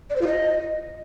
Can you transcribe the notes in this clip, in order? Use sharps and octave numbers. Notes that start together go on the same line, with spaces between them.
D5
C5
F4
D#5